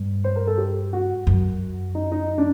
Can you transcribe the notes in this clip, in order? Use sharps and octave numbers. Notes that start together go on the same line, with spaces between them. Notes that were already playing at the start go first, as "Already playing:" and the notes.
Already playing: G2
C5
A#4
A4
G4
F#4
F#2
D#4
D#4
D4